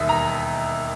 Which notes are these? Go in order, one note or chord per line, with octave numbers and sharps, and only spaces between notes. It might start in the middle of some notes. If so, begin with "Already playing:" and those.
Already playing: E1 D#2 D#3 G3 D#5 E5
A#5